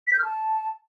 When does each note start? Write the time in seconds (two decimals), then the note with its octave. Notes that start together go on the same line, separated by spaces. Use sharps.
0.07 B6
0.13 G6
0.19 F6
0.25 A5